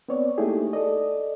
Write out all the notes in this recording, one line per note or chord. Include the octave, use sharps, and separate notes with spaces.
B3 C4 C#5 D5
A3 A#3 D#4 E4 G4 G#4
A4 D5 D#5